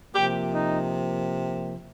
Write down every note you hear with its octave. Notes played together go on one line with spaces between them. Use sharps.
C3 F3 A#3 G4
D#4